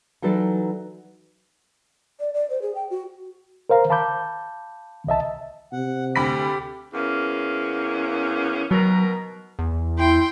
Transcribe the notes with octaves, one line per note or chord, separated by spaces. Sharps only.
E3 F#3 D#4 A4 B4 D5
D5
D5
C5
G#4
G5
F#4
A#4 C5 F5 A#5
F5 A5 B5 D6 G6
C2 D#5 E5 A5
C3 F#5
D2 G4 B5 B6
E2 A#3 C#4
B2 D#3 F#3 A#4
E2
E4 G5 C6